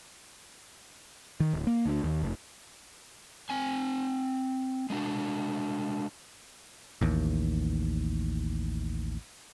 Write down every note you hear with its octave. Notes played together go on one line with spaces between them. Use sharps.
D#3
D1
A#3
D2
D#2
F1
C4 G#5
G#3 A3 D4 F#4
A1 D#2